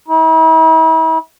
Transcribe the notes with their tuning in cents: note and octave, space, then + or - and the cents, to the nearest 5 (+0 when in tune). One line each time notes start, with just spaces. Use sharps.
E4 -45